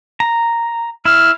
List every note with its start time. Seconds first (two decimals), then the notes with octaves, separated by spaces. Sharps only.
0.20 A#5
1.05 E4 F6